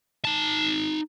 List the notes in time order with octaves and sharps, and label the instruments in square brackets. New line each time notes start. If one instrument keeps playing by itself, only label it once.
[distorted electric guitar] D#4 A5